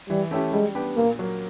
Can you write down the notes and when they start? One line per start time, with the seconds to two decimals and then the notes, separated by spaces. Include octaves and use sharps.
0.09 E3 G3
0.31 A3 C#4 E4 G4
0.53 G3 G#3
0.75 B3 D4 G4
0.97 A#2 A#3
1.19 F#3 A#3